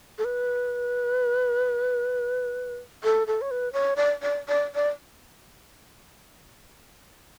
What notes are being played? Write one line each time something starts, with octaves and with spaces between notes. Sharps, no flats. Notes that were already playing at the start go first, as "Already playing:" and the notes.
A4
B4
A4
A4
C#5
B4
C#5
D5
D5
D5
D5